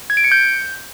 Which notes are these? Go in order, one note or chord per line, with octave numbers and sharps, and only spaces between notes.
G#6
D7
C#7
G6